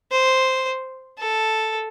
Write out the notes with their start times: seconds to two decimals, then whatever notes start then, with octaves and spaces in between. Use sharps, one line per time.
0.11 C5
1.18 A4